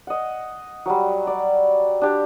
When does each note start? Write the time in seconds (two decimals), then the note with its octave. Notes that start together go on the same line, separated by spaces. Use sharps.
0.07 D#5 F#5
0.86 F#3 G3
1.27 D5
2.02 D4 G4